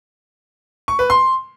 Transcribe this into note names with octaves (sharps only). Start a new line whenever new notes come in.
C#6
B4
C6